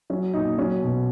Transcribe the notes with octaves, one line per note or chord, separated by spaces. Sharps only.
F#3 C#4
A#2 D#4
F#3 C#4
B2